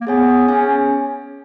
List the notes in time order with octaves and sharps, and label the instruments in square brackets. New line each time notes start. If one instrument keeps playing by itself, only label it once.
[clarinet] A#3
[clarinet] B3 [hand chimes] G#4 C#5 G#5
[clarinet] C#4 [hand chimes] G#4 C#5 G#5